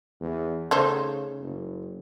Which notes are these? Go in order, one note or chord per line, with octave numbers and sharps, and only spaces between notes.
E2
C#3 A3 D#4 C5
F#1